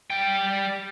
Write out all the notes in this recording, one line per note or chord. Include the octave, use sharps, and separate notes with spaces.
G3 G5